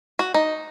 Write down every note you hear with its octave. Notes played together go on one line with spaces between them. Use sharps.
F#4
D#4